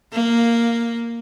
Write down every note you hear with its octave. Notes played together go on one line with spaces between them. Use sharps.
A#3